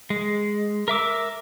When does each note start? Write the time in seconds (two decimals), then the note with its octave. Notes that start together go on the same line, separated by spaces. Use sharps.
0.10 G#3
0.88 A#4 E5 D6 E6